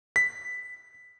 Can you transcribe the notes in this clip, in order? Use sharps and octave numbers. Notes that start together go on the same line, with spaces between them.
B6